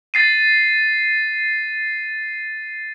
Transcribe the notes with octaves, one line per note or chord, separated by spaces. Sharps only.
A6 C7 D#7